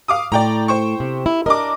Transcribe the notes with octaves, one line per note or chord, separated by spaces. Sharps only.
F5 D6 D#6
A2 D5 G5 A#5
C5 G5 C#6
C3
E4
D4 A#4 D#5 D6